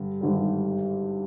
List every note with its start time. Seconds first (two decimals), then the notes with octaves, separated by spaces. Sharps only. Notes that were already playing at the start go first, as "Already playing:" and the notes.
Already playing: G2 D3 G3
0.21 G#1 G2 D3 G3